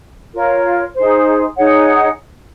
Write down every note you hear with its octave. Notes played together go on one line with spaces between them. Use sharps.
F4 A#4 C#5
D#4 G#4 C5
D#4 G#4 C#5 F#5